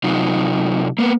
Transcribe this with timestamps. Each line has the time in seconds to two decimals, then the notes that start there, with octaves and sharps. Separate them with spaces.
0.04 C3 F#3 D#4 F4
0.98 A#3 B3